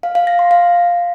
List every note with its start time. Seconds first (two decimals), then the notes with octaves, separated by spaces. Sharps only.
0.03 F5
0.15 F5
0.27 A#6
0.39 C6
0.51 F5